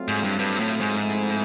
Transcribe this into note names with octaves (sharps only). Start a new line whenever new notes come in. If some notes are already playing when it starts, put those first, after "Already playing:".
Already playing: F#3 A3 C4 F4
G#2
G2
G2
A2
G#2
F3 A3 C4 E4